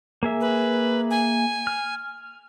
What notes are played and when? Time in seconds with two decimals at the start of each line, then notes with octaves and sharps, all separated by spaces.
0.23 A#3 G#4 E5
0.41 B4
1.11 G#5
1.67 F6